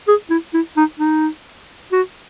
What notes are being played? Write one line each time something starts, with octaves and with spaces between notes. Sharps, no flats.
G#4
E4
E4
D#4
D#4
F#4